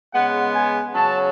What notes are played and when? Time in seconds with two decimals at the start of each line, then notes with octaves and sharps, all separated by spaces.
0.14 C#3 G#3 B3 F#5
0.54 G#5
0.93 C#3 F#3 C#4 A5